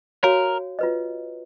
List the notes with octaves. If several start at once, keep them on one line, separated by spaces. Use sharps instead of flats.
F#4 A#4 C#5 F5
F4 B4 D#5